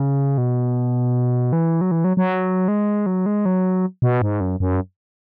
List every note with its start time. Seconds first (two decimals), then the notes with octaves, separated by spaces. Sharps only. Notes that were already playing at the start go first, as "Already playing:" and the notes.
Already playing: C#3
0.38 B2
1.53 E3
1.81 F#3
1.91 E3
2.04 F#3
2.17 F#3
2.68 G#3
3.06 F#3
3.26 G#3
3.46 F#3
4.02 B2
4.22 G#2
4.41 F#2
4.60 F#2